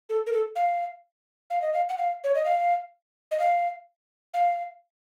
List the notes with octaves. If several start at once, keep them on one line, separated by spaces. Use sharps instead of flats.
A4
A#4
A4
F5
F5
D#5
F5
F#5
F5
C#5
D#5
F5
D#5
F5
F5